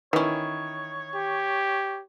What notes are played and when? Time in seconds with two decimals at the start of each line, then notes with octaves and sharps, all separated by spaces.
0.13 D#3 E3 C#4 E4 C#5
1.15 G4